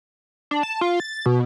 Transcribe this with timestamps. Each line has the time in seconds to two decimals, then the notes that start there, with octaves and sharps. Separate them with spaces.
0.51 D4
0.63 A5
0.81 F4
1.00 A6
1.26 B2